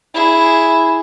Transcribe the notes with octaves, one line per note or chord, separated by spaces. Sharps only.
E4 G#4